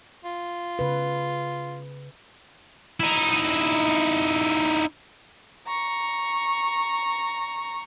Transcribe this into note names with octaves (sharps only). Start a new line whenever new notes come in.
F4
C#3 B4
D#4 E4
A#5 C#6